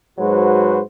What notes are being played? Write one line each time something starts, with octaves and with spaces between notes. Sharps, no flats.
G#2 F#3 G#3 F#4 B4 C5